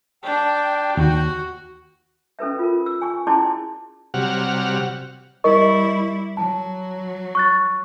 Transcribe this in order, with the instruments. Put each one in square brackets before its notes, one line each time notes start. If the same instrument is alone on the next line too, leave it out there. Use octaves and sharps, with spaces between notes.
[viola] D4 [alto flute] G5
[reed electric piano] D#2 [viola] F#4
[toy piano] C#4 A4 B4 E5
F4 A#4
E6
G#5 C#6
C#4 E4 G#4 D5 A5 C6
[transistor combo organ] C3 F#3 G3 F#5 F6
[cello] G3 E4 [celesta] A#4 D#5 C#6
[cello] F#3 [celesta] A5
[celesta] C#6 F#6 A6